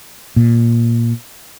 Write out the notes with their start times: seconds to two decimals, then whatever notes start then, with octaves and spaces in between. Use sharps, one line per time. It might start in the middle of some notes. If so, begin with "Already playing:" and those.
0.36 A#2